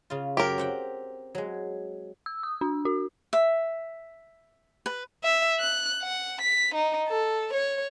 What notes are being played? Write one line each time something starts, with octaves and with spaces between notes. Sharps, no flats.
C#3 F4
F#2 F#3 G4 A#4 F5
C4 F#5 G5
F#3 G#3
E6
D#6
D4
F#4
E5
B4
E5
F#6
F#5
B6
D#4
A4
C#5